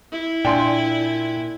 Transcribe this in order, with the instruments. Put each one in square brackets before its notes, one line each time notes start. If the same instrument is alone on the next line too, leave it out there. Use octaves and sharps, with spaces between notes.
[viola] E4
[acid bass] A#2 [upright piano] D4 C6 [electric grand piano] G5 G#5